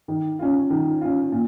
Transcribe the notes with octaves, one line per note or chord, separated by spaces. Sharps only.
D#3
C#4 F4
D#3
C#4 F4
A#2